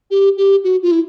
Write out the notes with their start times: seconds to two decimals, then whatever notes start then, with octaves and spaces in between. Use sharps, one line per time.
0.11 G4
0.37 G4
0.64 F#4
0.82 F4
0.91 E4